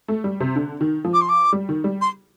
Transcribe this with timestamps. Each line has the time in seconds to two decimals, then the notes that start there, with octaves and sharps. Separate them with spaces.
0.08 A3
0.24 G3
0.40 C3
0.56 D3
0.81 D#3
1.05 F3
1.13 D6
1.21 C6
1.29 D6
1.53 G3
1.69 D#3
1.84 G3
2.01 C6